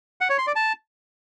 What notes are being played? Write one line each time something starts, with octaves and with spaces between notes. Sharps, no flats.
F#5
C#5
C6
D5
A5